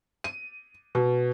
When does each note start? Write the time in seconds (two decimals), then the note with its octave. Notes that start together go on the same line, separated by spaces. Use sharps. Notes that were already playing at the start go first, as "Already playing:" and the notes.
0.24 D#7
0.95 B2